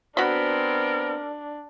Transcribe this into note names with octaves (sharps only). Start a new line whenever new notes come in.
B3 C4 D4 F#4 A#4 B5